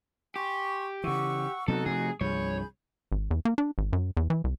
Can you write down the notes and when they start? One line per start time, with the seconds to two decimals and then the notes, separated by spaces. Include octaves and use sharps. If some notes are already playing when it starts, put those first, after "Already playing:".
0.36 G4 G#5 C6 C#6
1.04 C#3 E3 F#5 C#6 E6
1.68 C3 F#3 B3 D#4 F#4 A4
1.86 C3 F3 A3 G#4
2.21 C2 G2 F3 G#4 C#5 B5 G6
3.12 G#1
3.31 E2
3.45 A#3
3.58 D4
3.78 G#1
3.93 F#2
4.17 E2
4.30 E3
4.44 C2